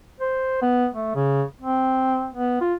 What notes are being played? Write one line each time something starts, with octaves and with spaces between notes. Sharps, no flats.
C5
B3
A3
C#3
C4
B3
F4